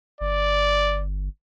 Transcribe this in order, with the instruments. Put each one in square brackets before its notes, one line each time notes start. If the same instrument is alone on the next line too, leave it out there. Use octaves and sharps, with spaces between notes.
[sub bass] G1 [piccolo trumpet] D5